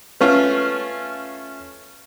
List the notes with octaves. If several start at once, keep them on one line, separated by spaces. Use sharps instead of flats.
A3 C#4 F4 B4